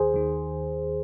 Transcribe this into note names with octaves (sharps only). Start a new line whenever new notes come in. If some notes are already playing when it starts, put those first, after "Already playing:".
Already playing: D#2 D#3 G#4 C5
D#2 D#3